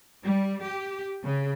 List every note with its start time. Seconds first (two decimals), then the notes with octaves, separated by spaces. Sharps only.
0.23 G3
0.65 G4
1.24 C#3